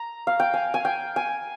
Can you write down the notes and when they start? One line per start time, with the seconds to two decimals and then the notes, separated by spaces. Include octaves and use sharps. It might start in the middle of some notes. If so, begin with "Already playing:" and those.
Already playing: A#5
0.27 F5
0.40 G5
0.54 G#5
0.74 G#5
0.85 G5
1.16 G#5